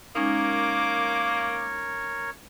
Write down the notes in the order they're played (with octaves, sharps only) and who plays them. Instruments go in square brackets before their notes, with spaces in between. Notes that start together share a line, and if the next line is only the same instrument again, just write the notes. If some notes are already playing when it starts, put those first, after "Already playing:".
[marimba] G#3 C#4 D#4 [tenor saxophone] A#3 [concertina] A#4 C#5 [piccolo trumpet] D6